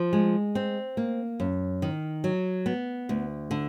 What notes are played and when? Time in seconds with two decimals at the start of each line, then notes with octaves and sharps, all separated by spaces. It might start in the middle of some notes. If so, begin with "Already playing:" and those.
Already playing: F3
0.13 G#3
0.55 C4
0.97 A#3
1.40 F#2
1.82 D#3
2.24 F#3
2.66 B3
3.09 D2
3.51 D3